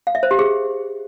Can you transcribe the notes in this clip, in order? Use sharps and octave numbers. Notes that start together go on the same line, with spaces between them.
F5
E5
C5
G4
G#4